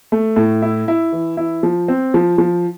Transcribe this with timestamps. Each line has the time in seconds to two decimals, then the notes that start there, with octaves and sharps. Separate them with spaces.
0.12 A3
0.36 A2
0.62 E4
0.88 E4
1.12 E3
1.37 E4
1.63 F3
1.88 C4
2.14 F3
2.38 F3